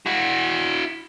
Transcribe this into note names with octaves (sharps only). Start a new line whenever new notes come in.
E4 F#4